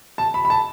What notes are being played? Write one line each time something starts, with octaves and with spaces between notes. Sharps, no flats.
A5
B5
B5
A5